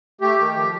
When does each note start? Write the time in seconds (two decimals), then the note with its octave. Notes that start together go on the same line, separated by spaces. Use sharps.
0.21 A3 G4
0.39 D#3
0.55 F3